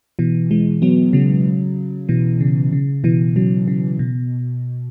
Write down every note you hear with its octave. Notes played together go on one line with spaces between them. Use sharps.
B2 E3
E3 G#3
F#3 B3
C#3 F#3
B2 E3
C#3
C#3
B2 E3
C#3 F#3
C#3
B2